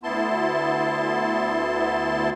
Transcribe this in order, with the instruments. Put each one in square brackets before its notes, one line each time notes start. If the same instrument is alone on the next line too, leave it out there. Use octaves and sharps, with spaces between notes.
[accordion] D2 B3 E4 A5 C6